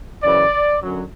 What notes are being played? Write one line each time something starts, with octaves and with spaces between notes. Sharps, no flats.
F#2 C#3 E3 D5
F#2 D3 F#3